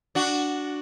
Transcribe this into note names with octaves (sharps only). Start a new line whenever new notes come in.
D4 F#4